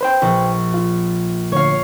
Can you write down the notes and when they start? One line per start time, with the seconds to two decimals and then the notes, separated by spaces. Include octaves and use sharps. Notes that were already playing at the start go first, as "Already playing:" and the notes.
0.01 B4 C5 G5
0.22 A#1
0.74 F4
1.52 D2 C#5 F5